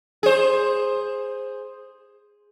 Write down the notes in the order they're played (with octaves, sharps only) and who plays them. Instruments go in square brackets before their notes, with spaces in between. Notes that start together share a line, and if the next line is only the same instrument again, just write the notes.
[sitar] G#4 C5